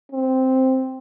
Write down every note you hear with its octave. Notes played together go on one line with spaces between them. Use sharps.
C4